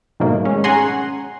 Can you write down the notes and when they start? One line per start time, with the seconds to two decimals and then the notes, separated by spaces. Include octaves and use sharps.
0.20 G#2 B2 D#3 F#3 A3 A#3
0.45 G#3 C#4
0.64 C#4 G#4 F#5 G#5 A#5 C6